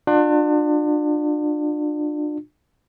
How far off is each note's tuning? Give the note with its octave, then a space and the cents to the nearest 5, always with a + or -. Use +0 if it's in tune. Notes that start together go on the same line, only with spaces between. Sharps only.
D4 +30 F4 +35